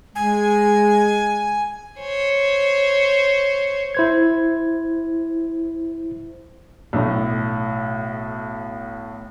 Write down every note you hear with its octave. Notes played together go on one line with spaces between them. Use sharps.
G#3 G#5
C5 C#5
E4 C5 G#6
B1 A2